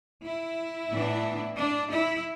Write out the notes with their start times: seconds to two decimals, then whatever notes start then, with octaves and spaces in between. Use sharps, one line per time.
0.23 E4
0.90 A2 E3 B3 D4
1.56 D4
1.90 E4